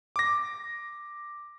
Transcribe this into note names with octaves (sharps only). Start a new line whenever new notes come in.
D6 A#6